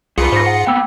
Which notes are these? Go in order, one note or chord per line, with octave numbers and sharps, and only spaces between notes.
C2 F#2 F4 G#4 B4 C#7
G#2 C5 A#6
F#5
A#3 B3 G5 E6